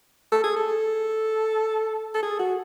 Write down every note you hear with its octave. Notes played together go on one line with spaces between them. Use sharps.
A4
G#4
A4
A4
G#4
F#4